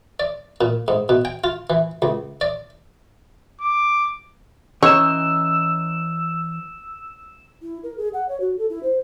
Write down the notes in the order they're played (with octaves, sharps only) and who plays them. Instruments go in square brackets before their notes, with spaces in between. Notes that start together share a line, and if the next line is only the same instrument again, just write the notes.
[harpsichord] D5
A#2
G#2
B2
G5
F4
E3
C#2
D5
[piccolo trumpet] D6
[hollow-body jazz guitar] E3 C#4 D#4 [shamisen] C#5 [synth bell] E6 E7
[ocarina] E4
A#4
G#4
F#5
C#5
F#4
A4
E4
C5